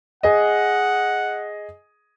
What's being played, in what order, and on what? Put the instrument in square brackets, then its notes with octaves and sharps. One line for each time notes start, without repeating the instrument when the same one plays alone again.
[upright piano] G#4 D#5 [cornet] F#5